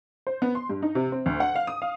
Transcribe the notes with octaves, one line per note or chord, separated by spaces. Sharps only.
C5
B3
C6
G2
D#4
C3
C4
D2
F#5
F5
D#6
F5